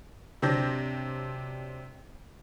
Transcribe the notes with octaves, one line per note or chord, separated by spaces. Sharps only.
C3 F#3 C4 D4 G6 A#6